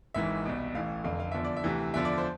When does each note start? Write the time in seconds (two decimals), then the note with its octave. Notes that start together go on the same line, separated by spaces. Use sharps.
0.14 G#1 G#2 E3 E5
0.45 C2 B2
0.75 A1 A2 E3 F5
1.04 F1 F2 D3 F5
1.20 F5
1.32 E2 D3 F3 E5
1.45 D5
1.57 E5
1.64 D2 C3 E3
1.94 E2 D3 F3 E5
2.05 D5
2.18 C5